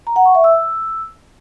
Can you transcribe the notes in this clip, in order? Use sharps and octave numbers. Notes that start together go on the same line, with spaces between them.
A#5
F#5
C#6
E5
E6